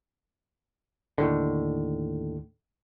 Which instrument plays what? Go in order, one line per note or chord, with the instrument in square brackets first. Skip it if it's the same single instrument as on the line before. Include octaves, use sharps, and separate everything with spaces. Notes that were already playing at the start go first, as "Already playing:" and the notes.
[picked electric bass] D#2 A2 D3